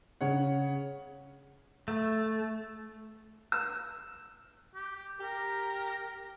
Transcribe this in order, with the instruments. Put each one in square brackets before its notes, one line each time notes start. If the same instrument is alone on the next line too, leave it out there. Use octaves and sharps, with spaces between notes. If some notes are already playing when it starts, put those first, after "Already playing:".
[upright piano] C#3 C#5 F#5
[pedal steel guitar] A3
[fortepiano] E6
[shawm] G4
[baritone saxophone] G4 [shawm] A#4